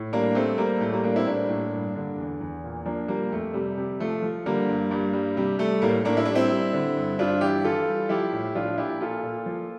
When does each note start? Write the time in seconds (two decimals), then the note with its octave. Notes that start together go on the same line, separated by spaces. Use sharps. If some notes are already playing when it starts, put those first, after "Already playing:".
Already playing: A2
0.13 G3 A#3 D4
0.35 G3 A3 C4
0.58 G3 A#3
0.81 A2 A3
0.92 G3 A#3
1.04 G3 A#3 D4
1.16 C4 E4
1.26 A2 A#3 D4
1.49 A2
1.73 G2
1.95 D3
2.18 E2
2.40 E2
2.64 A#2
2.85 F3 A#3 D4
3.08 F3 G3 A#3
3.32 F2 A3
3.54 C3 G3
3.77 C3
4.00 F3 A3
4.22 F3
4.46 D3 G3 A#3
4.69 G2
4.91 G2
5.13 G3
5.36 C3 G3
5.59 G3 A3
5.81 A2 G3 A#3
6.05 A2 A#3 D4
6.17 E4
6.25 G3 D4
6.35 C4 E4
6.51 G3
6.73 D3
6.96 G2
7.19 G2 D4 F4
7.41 E3 E4 G4
7.64 E3 F4 A4
7.87 G3
8.09 F3 E4 G4
8.33 A2
8.55 F3 D4 F4
8.78 A#2 E4 G4
9.01 A#2 F4 A4
9.23 A#2
9.46 F3